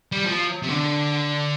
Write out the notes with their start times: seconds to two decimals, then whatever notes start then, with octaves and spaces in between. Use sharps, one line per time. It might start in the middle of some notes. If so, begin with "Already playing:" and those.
0.12 G3
0.25 F3
0.63 C3
0.69 D3